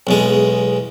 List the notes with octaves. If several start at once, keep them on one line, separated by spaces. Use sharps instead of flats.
B1 E2 G#3